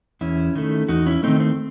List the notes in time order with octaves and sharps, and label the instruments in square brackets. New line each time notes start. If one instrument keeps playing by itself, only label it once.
[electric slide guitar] E2 C#4 E4
D#3 A3
E2 D#4 F#4
C#4 E4
D#3 A3 C4 D#4
C4